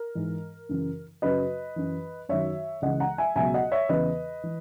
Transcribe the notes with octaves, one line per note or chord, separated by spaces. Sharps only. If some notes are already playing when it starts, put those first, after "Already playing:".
Already playing: A#4
G#2 E3
F#2 C#3 E3
F#2 C#3 F#3 B4 D#5
F#2 E3
F#2 D#3 F#3 C#5 E5
C#2 C#3 E3 D#5 F#5
F#5 A#5
E5 G#5
C#2 B2 F#3 E5 G#5
D#5 F#5
C#5 E5
E2 C#3 E3 B4 D#5
E3